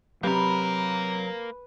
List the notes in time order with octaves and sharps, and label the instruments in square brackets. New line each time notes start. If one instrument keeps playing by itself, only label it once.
[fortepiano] C3 G4 [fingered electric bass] F#3 [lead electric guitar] A#3 A#4 [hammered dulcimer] B4